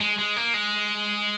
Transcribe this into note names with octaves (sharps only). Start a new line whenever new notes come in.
G#3
G#3
A#3
G#3